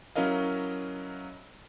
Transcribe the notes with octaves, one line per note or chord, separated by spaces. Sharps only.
F#3 C#4 E4 A#4 D#5 F5